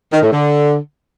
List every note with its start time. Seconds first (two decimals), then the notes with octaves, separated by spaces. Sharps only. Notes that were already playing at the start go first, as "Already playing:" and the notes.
0.13 D#3
0.22 A2
0.32 D3